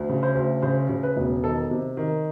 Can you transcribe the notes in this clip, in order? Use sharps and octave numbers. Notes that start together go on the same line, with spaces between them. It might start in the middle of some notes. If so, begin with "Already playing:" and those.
Already playing: D2
C#3
C5
D2
C#3 C5
C#3
B4
E1
D#3 A4
C3
D#3